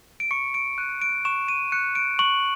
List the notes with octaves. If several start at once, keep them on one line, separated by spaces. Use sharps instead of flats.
D7
C#6 C#7
D7
F#6 D#7
D7
C#6 E7
D#7
F#6 C#7
D7
C#6 F#7